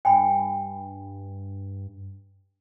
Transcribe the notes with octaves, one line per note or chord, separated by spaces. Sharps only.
G2 G5 G#5 B5